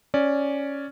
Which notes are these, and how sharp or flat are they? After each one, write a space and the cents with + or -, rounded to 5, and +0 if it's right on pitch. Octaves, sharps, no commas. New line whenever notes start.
C#4 +0 D5 +0